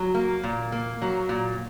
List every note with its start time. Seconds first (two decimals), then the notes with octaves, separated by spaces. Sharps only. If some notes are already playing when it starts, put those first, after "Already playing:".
Already playing: F#3
0.15 A#3
0.44 A#2
0.72 A#3
1.02 F#3
1.29 A#2